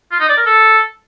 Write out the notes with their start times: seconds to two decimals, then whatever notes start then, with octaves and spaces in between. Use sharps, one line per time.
0.11 F4
0.20 D#4
0.29 D5
0.37 A#4
0.46 A4